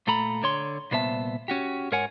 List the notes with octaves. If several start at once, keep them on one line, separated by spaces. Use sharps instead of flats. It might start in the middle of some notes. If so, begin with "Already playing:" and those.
A#2 A3 A4 A#5 B5
D3 C#5 C6
C2 A#2 B3 C5 E5 A5
C#4 F#4 G4
G#2 A#4 C#5 F#5 G#5